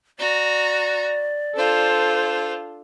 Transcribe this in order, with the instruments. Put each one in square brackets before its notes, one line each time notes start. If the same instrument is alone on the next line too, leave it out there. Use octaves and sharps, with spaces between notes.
[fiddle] F#4 A#5 [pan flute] D5
[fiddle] D4 F4 [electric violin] A4 [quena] C5